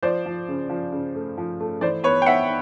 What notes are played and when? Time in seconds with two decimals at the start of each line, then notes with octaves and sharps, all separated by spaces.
0.03 F3 C5 D5
0.26 F3
0.48 C#3
0.70 F3
0.92 C#3
1.15 A3
1.38 F3
1.60 A3
1.81 E3 C5 D5
2.04 B3 B4 C#5
2.22 G5
2.26 B3 E5 F#5